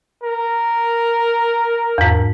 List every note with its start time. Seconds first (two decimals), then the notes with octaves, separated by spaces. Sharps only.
0.23 A#4
1.98 E2 G#2